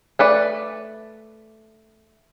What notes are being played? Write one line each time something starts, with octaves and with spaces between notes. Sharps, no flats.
A3 B4 D5